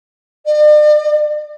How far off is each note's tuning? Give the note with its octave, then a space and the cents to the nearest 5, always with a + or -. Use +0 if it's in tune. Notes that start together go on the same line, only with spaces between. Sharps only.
D5 +40